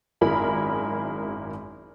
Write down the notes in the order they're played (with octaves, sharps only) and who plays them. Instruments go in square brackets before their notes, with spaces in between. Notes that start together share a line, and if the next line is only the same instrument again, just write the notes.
[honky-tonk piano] G#1 F#2 E4 G#4 A#4 B5